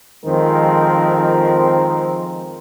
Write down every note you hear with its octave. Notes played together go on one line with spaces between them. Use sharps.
F2 D#3 F3 G#3 C4 A#4